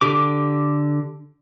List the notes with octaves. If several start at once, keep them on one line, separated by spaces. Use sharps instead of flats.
D3 G4 D6